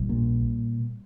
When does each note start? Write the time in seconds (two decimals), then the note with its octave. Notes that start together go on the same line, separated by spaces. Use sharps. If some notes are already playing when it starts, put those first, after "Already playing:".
Already playing: A#1 G3
0.09 A#2